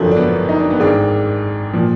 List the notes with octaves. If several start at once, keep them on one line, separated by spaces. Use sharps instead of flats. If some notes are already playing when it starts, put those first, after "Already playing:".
Already playing: F#1 F2 D3 F3 F#3
D4
B3
D#4
D4
B3
G#1 G#2 D#3 D4
A#2 F3